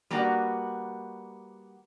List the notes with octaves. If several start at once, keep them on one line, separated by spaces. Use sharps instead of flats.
G3 A#3 B3 D4 F#4